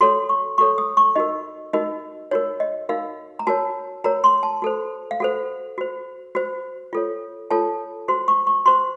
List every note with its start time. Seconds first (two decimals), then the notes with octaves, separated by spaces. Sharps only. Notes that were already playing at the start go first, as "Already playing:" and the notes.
0.01 F#4 A4 C#5 C6
0.29 C#6
0.58 F#4 A4 C#5 C#6
0.78 D#6
0.97 C#6
1.16 D#4 F#4 A#4 D#5
1.73 D#4 F#4 A#4 D#5
2.31 D#4 F#4 A#4 C#5
2.60 D#5
2.89 D#4 F#4 A#4 F5
3.39 A#5
3.47 F#4 A#4 C#5 A5
4.04 F#4 A#4 C#5 A#5
4.24 C6
4.43 A5
4.62 F#4 A4 C5
5.11 F5
5.20 F#4 A4 C5 F#5
5.78 F#4 C5
6.35 F#4 C5
6.93 F4 A4 C#5
7.51 F4 A4 C#5 A5
8.08 F#4 C5 C6
8.28 C#6
8.47 C#6
8.66 F#4 C5 C6